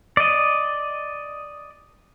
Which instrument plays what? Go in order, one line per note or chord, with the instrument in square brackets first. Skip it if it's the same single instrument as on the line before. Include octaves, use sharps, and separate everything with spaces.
[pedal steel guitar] D5 D#5